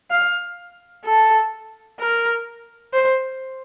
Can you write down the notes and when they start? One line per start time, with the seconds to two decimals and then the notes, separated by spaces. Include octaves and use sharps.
0.11 F5
1.05 A4
2.00 A#4
2.94 C5